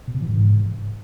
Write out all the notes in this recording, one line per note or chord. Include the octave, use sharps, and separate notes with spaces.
B2
C3
E3
G#2